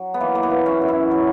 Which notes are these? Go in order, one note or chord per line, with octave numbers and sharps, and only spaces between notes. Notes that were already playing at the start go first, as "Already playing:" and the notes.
Already playing: F#3
B3
E3 A#3
A#3
B3
E3
C#4
F#2
E4
F#3